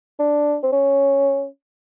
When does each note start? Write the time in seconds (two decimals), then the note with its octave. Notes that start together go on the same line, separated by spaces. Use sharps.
0.19 D4
0.63 C4
0.72 C#4